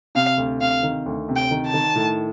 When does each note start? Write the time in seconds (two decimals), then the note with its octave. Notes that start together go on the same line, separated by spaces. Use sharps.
0.15 C3 F5
0.38 D2
0.61 C3 F5
0.83 D#3
1.06 D2
1.29 C3
1.36 G5
1.51 D#3
1.67 A5
1.74 D#3
1.95 A2